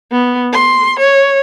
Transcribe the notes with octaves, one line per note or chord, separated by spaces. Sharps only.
B3
C6
C#5